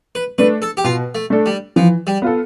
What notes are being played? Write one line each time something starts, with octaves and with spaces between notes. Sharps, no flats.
B4
A3 D4 A4 B4
A4
G4
B2 F4
A3
A3 D4 A4
G3
E3 F3
G3
B3 F4 A4